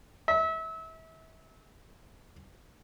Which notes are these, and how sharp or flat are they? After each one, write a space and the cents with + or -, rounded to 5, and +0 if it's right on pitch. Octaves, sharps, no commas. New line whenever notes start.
E5 -30